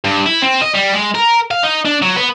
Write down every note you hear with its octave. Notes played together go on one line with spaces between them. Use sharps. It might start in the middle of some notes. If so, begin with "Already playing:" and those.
G2
E4
C4
D#5
G3
G#3
A#4
F5
D#4
D4
F#3
B3